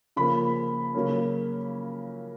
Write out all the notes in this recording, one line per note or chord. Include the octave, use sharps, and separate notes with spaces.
C#3 F3 A#3 B5
C#3 F#3 A#3 C#4